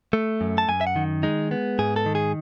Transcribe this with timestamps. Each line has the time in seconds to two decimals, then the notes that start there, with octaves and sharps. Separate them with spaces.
0.13 A3
0.41 F#2
0.58 A5
0.69 F#2 G#5
0.81 E5
0.87 F#5
0.96 D#3
1.23 G#3 D#4
1.51 B3
1.79 G#2 G#4
1.96 A4
2.06 D#3
2.15 G#4